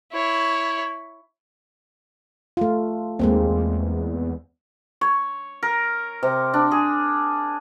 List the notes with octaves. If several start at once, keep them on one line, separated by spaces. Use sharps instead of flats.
E4 C#5
A3 F4
D#2 G#3 A#3 C4
E2
C#5
A#4
C3
D4
G#4